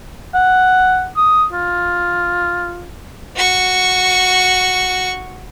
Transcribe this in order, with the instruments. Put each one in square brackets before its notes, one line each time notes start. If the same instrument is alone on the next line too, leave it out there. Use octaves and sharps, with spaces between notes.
[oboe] F#5
D#6
F4
[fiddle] F#4 C#6